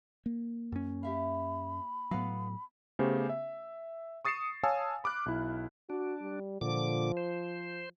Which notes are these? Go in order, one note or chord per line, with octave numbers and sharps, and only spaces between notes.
A#3
F#2 C#4
G4 E5 F5 B5
A2 F#3 B3 F5 F#5
C#3 A3 B3 C#4 G4 C5
E5
C#6 D#6 A6 C7 C#7 E7
C#5 F5 G#5 A5 D#6 E6
B5 D6 F6 F#6
B1 E4
D4 F#4
G3
A#2 D3 F3 D6
C5